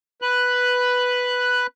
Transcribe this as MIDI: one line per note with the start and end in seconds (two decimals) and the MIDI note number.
0.22 1.67 71
0.22 1.67 90